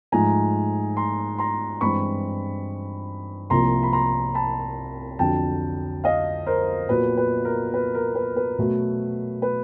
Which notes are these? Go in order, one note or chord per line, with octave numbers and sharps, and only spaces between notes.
G#2 F3 A3 G#5 A#5
A#5 C6
A#5 C6
G2 E3 G#3 C4 B5 C#6
C2 C3 F3 A#3 A#5 C6
B5
A#5 C6
A5 B5
F2 D3 F#3 G5 A5
D#5 F5
A#4 C5
A#2 F#3 B3 B4
B4
A#4
B4
A#4
B4
B4
B2 F#3 A3
B4